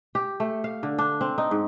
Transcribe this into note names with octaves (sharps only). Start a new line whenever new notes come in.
G4
A3
F5
D3
D4
C4
D#4
G#2